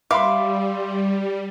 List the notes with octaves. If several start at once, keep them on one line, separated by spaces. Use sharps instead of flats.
G3 E5 F5 B5 C6 D6